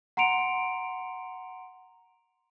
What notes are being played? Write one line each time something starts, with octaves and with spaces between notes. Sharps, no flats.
F#5 A#5 C6 C#7 D7 F7